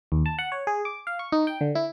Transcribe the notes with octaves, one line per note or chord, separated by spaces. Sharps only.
D#2
A5
F#5
C#5
G#4
D6
F5
C#6
D#4
G5
D3
E4